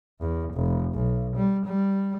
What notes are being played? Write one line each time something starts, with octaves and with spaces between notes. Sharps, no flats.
E2
F1
B1
G3
G3